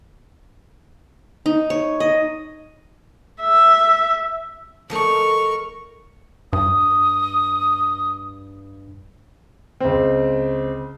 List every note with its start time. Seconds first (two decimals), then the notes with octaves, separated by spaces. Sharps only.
1.46 D#4
1.70 C#5
2.00 D#5
3.41 E5
4.90 F3 A3 D#4 A#4 C#6
6.53 G2 D#6
9.80 C#2 C4